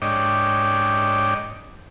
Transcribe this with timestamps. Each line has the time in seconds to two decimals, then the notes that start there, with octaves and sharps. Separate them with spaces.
0.02 G#2 D4 C#5 D#5 G5 D6